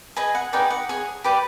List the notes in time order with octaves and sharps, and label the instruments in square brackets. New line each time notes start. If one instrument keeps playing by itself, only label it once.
[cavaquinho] G#4 B4 D#5 G#5
F#5
D#4 G#4 B4 D5 G5
F#5
G#4 C#5
G4 B4 D5